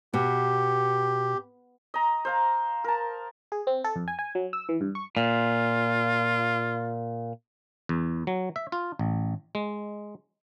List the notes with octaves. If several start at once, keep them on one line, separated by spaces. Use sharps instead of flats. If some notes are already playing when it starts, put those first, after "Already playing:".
B2 G4
D#5 A#5
C5 F5 A#5
A#4 A5
G#4
C4
A4
F2
G#5
G#5
F#3
E6
E3
G2
C#6
A#2 F4
E2
F#3
E5
F4
A1
G#3